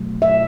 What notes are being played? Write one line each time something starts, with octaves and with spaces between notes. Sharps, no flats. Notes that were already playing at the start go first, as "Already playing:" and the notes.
Already playing: B2 F#3 A3
E5